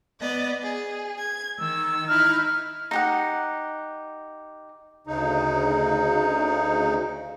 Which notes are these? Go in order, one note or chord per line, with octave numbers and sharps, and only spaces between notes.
B3 D5 D#5
G#4
G#6
D#3 E6
D#4 E4 F6
D#4 G4 F#5
D2 C#3 D#4